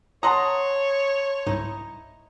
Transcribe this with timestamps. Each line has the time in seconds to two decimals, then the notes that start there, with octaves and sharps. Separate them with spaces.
0.23 C#5 D#5 F#5 A5 A#5 C6 D#6
1.47 C2 G#2 D#4 E4